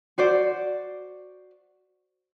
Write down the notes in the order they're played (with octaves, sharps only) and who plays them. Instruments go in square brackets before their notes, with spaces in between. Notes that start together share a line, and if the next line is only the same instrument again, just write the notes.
[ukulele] F#4 C5 D5